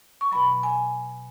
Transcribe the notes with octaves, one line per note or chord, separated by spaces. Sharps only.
C#6
B2 F#3 B5
G#5